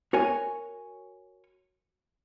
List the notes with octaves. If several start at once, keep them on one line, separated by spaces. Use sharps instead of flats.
F#4 A#4 C#5 G#5